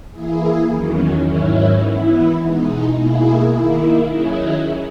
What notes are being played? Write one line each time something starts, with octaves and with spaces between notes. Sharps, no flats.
E3 A#3 E4 G#4
E2 D#3 F#3 C#4
G#2 D#3 F#3 C#4 E4
E3 B3 E4
B2 G#3 D#4
B2 A#3 E4 G#4
D#3 A#3 E4
D#3 F#3 C#4 E4 G#4